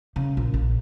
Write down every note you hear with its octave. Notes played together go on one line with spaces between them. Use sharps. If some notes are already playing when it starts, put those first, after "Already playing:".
C#3
A#1
A#1